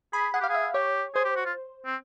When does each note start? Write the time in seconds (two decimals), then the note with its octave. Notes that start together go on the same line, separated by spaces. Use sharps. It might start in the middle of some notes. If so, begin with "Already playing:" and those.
0.13 G#4 B5
0.34 G#4 F#5
0.41 G4
0.44 F5
0.49 G#4
0.55 E5
0.74 G4 C#5
1.15 G#4 C5
1.25 G4
1.36 F#4
1.45 F4
1.85 C4